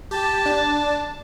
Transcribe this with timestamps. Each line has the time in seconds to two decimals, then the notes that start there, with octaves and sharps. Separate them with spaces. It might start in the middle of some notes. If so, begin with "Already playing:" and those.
0.11 G4 A5
0.46 D4